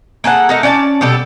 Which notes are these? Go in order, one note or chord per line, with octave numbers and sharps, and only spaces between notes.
A#3 G#4 A4 F#5
A3 D#4 A#4
C#4 D5 F#5 A5
B2 G3 G4 A4